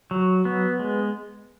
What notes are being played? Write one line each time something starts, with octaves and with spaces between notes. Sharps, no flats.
F#3
B3
G#3